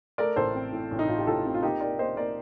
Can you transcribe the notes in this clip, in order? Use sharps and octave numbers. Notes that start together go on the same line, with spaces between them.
A3 A#4 D5
A1 A4 C5
C4
A2
A1
D#4
A2 F4
G4
A1 F4 A4
C4
F4
A#3 D#4 G4
A#3 A#4 D5
A#3 C5 D#5
A#3 A#4 D5